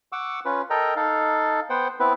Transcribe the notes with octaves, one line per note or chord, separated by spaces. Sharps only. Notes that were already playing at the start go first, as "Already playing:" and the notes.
F#5 C#6 D6 E6
C#4 F4 B4
A4 A#4 D#5 G5 A#5
D#4 A4 F5
B3 C5 F#5 G5
B3 C4 E4 B4